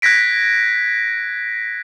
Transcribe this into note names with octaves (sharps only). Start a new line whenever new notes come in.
F#6 G#6 A#6 B6 D7